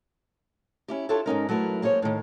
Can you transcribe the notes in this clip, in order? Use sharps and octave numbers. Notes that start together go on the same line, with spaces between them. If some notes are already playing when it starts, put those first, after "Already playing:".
C#4 E4 G4
D4 E4 F4 G4 A4 C#5
G#2 C#4 D#4 A#4
F#3 A3 E4 A#4 B4
A#3 G#4 C5 C#5
A2 D#3